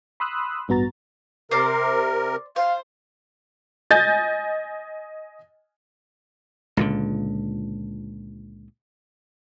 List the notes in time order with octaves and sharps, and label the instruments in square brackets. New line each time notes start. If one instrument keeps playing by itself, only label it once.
[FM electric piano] B5 C6 D#6 E6 F#6
A1 G2 B3 F#4 A#5 A6
[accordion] C3 A#4 [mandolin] C5 D5
[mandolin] C5 [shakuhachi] F5
[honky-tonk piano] D#5 G#5 G6 A6
[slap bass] C#2 A#2 D3